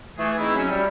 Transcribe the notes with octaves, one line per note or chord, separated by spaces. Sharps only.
E3 A3 G#4
G#3 C4 D#4 E4
F#3 C#4 E5
G3